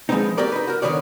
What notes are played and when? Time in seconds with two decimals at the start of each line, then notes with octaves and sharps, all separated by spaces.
0.09 F3 G#3 A3 B3 C4 D#4
0.37 A#3 F#4 G4 A4 A#4 D5
0.52 D#4 B4
0.67 F#4 A#4
0.82 D3 D#3 B3 G4 C#5 D5